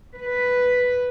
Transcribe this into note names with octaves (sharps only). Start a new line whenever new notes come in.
B4